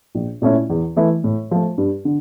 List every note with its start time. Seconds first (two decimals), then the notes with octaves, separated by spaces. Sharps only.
0.15 A#1
0.42 A#2 A3 C#4 E4
0.70 E2
0.96 E3 A3 E4
1.24 A2
1.51 F3 A3
1.78 G2
2.05 D3